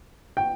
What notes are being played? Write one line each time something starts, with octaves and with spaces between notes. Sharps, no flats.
G5